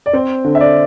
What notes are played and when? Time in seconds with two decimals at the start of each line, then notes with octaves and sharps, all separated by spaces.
0.06 D5
0.13 C4 C5
0.44 D3
0.55 E5
0.61 D5